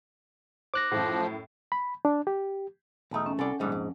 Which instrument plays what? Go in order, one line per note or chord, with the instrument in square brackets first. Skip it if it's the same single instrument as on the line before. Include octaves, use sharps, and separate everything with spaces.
[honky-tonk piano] C5 [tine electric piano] D6 F#6 A#6
[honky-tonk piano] F#2 A2 [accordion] F3
[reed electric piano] B5
D4
G4
[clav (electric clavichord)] B1 D#4 [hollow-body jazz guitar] E2 A3
[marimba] C#4
[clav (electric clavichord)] C2 [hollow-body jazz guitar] A4 D5 [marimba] F#5 G#5
[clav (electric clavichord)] A#1 G#2 [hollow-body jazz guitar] D3 G3 A3
[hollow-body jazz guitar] F2